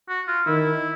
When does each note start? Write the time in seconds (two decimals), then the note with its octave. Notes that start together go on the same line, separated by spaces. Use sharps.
0.09 F#4
0.28 F4
0.46 D#3 E4